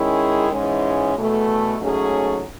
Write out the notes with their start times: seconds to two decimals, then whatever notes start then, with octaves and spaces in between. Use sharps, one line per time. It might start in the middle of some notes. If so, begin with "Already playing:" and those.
Already playing: D#3 G#3 C#4 E4 G#4
0.51 G#2 E3 G#3 C#4
1.16 E2 B2 A3
1.79 G#2 F#3 A3 C#4 G#4